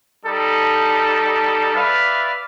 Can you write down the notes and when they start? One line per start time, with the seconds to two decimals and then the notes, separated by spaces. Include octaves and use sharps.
0.25 G3 D#4 A4
1.75 B4 D5 E5 F5